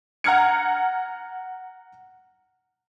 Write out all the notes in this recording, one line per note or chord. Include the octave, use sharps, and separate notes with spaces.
F#5 A#5 F6 G#6 C#7